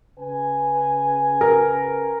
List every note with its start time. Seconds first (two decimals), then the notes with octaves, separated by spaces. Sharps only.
0.18 C#3 B4 G#5
1.41 A#4